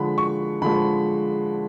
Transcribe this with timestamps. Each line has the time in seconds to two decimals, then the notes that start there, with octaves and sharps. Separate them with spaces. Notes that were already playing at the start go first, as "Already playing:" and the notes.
Already playing: D3 F3 G#3 B5
0.18 C#6
0.62 D3 F3 G#3 B5